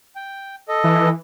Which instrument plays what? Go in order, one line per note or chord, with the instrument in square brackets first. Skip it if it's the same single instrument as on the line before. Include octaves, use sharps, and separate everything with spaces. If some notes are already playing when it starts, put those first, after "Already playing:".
[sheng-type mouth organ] G5
A4 D#5
[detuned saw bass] E3